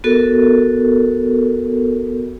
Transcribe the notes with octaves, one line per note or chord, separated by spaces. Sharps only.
B3 F#4 A4 A#4